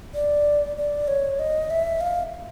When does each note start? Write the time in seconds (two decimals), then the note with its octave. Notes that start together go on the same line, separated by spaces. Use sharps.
0.14 D5
0.77 D5
1.08 C#5
1.39 D#5
1.70 E5
2.01 F5